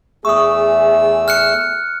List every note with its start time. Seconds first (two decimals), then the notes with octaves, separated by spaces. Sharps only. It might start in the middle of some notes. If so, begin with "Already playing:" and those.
0.25 E2 A3 G#4 C#6 D#6 E6
1.28 F6 F#6 C#7